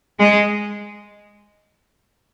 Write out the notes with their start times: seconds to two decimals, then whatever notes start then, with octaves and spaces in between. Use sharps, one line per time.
0.19 G#3